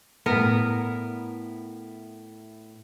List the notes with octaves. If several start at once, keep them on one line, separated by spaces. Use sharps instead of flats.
A2 B3 E4 A#4